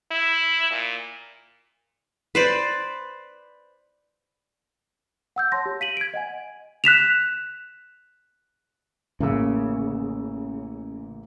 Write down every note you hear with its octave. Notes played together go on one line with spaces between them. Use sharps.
E4
A#2
B4 C5 D5
F#5 E6 G6
C#5 A5 C6 A#6
G4
F5 B6 D#7 F#7
G#6 D7
D#5 F#5 G#5
F#6 B6 E7 F7
A1 C#3 A#3 E6